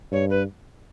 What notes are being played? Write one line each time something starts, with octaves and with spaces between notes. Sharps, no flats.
G2 C#5
B4